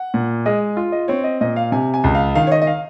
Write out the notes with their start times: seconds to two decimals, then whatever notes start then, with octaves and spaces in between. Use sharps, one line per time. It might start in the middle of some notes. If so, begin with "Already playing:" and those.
Already playing: F#5
0.14 A#2
0.46 G#3 D#5
0.77 F4
0.92 D#5
1.08 C4 C#5
1.24 D#5
1.41 A#2 D#5
1.56 F5
1.72 C3 G#5
1.94 G#5
2.04 C#2
2.15 F5
2.35 D#3 F5
2.47 C#5
2.52 D#5
2.62 D#5
2.67 F5